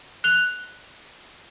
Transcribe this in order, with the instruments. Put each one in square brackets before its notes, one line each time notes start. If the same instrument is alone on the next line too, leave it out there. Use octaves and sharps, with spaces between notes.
[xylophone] F#6 F7 G7